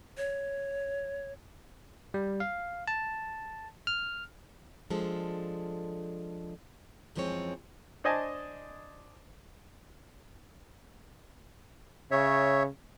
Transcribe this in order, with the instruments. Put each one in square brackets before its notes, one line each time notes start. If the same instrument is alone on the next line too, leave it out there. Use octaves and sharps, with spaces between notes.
[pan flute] C#5
[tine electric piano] G3
F5
A5
F6
[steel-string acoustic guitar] F3 G#3 D4 A4
F#2 E3 F3 G#3 C4 C#5
[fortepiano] D4 C5 D#5 G#5 A5
[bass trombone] C#3 [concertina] C#5 E5